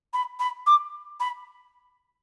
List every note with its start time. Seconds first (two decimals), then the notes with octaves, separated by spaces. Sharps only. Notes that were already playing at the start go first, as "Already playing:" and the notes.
0.13 B5
0.39 B5
0.66 D6
1.20 B5